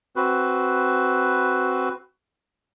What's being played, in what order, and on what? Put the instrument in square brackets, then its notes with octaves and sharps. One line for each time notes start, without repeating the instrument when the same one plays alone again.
[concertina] C4 F#4 B4